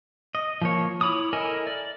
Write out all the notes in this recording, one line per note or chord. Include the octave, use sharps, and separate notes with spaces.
D#5
F3 A#3 C#5
E4 C#5 B5 D6 D#6
E4 A4 A#4 D#5 G#5
D5